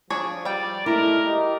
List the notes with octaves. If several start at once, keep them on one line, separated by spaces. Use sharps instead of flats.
F3 D4 G#4 C#5
G3 D5 G5
B2 G#3 A3 E4 A#4
G4 D#5